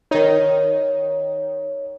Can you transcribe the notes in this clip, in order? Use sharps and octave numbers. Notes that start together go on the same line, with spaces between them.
D#3 D#4 C#5